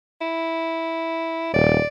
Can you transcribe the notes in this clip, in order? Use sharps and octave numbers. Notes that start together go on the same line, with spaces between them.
E4
D#1 D5